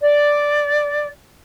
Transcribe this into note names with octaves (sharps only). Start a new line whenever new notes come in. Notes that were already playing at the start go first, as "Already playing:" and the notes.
D5